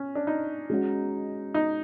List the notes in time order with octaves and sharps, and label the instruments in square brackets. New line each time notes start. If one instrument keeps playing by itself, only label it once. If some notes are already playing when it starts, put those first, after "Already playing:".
Already playing: [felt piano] C#4
D4
D#4
[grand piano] G#3 C#4 F#4
[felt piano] D#4